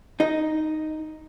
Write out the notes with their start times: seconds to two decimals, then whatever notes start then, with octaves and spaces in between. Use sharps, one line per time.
0.20 D#4 D#5